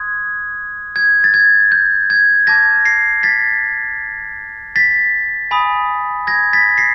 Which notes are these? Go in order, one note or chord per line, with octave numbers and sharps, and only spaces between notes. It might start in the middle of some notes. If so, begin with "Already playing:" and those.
Already playing: C6 D#6 F#6 G#6
G#6
A6
G#6
G6
G#6
A5 D6 F6 G#6 A#6
A#6 C7
A6 B6
A6 B6
G#5 B5 D#6
G#6 A#6
A6 B6
A#6 C7